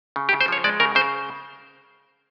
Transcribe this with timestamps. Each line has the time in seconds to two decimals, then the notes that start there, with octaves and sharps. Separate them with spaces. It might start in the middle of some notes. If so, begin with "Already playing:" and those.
0.16 C#3
0.29 G4
0.33 C#3
0.41 C5
0.48 F3 C#5
0.64 G#3 D5
0.80 C#3 A#4
0.95 C#3 C5